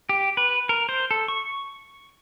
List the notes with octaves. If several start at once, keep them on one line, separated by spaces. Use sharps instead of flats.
G4
B4
A#4
C5
A4
C#6